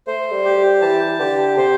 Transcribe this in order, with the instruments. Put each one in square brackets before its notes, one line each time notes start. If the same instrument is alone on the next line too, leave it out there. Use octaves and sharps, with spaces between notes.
[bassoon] A3 [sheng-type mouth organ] C5
[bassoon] G3
[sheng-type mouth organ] G4
[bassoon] G3
[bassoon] E3 [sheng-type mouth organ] A5
[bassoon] D3 [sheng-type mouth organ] G4
[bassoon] C3 [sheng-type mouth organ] C5